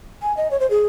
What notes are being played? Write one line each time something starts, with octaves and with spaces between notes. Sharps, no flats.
G#5
D#5
C#5
C5
G#4